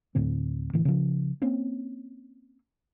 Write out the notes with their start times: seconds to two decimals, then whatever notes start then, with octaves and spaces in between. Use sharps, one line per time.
0.15 D1 A2 D3 C4
0.73 A2 D3 E3
0.85 C#3 F3
1.42 A#3 C4 C#4